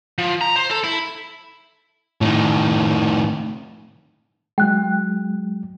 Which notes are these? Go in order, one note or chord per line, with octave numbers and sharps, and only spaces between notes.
F3
A#5
C5
A4
E4
A2 D#3
F#3 G#3 G5 F#6